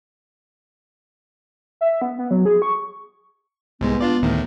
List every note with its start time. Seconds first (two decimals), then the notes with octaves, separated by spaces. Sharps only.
1.81 E5
2.02 B3
2.19 B3
2.31 F#3
2.45 G#4
2.62 C#6
3.81 C2 G#2 G#3 B3
4.01 D4 F4 D5
4.22 D2 A2 D#3